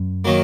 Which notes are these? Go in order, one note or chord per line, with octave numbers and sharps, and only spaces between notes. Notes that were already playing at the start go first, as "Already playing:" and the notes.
Already playing: F#2
D#3 F#3 A#3